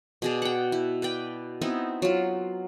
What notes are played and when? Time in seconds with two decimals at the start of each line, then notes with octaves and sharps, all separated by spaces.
0.22 B2 G#4 D5
0.42 F#5 G5
0.72 E4
1.02 B4 D5 G5
1.61 B3 C4 D#4 E4
2.02 F#3 F4